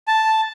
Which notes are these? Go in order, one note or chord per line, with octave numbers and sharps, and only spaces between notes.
A5